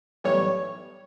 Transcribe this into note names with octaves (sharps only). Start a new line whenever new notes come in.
B1 A2 E3 G3 C#5